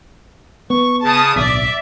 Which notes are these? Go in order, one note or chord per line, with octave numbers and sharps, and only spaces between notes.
B3 C#6
C#3 A5 D#6
D1 B1 D5 E5